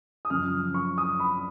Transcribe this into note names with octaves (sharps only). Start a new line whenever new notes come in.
D#6
F#2 C#3 F3 F6
C#6
D#6
B5